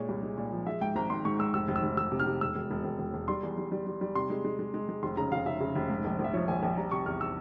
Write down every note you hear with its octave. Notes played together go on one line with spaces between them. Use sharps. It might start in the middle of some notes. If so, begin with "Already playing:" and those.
Already playing: A#2 G#3 C#5
C2
G#3
A#2
F3
G#3 E5
G#2 G5
G#1 A#5
G#1 C6
G#2 C#6
G#2 E6
F1 E6
F1
E6
F1
F1 E6
C3
F6
C3
E1 E6
E1
E1
E1
E1
E1
G3 C6
E2
G3
G3
G3
G3
C3 C6
G#3
G#3
G#3
G#3
G#3
F1 C6
C#3 A#5
F1 F5
C#3 E5
C#3
F1
G#2
A#1
A#1
E5
F3 C#5
A#1 G#5
A#1
G3 A#5
C3 C#6
E2 F6
E6